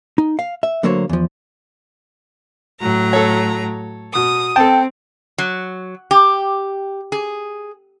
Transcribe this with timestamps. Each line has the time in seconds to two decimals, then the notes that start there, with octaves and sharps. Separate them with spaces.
0.18 D#4
0.39 F5
0.63 E5
0.83 D3 F#3 A3 A#3 C5 C#5
1.09 E2 F3
2.81 A2 F#3 A#5
3.13 A4 C#5
4.15 B2 D#6
4.56 C4 A4 G5 A5
5.38 F#3
6.11 G4
7.12 G#4